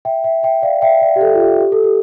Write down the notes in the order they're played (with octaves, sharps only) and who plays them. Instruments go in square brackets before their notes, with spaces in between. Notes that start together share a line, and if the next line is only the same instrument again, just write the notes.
[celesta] E5 G5
E5 G5
E5 G5
D5 F5
E5 G5
D5 F5
G4
A4
F4
G4
G4
A4
G4